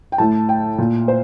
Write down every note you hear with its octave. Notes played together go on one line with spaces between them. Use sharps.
G5
A2 A5
G5
A#2
C5